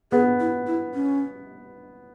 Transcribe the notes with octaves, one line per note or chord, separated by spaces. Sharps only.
B3 G#4
E4
E4
C#4